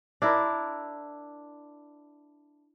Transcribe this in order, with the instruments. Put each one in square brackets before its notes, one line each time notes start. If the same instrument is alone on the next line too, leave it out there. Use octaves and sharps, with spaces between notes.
[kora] D4 E4 A#4